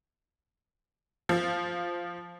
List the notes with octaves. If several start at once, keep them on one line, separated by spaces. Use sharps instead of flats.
F3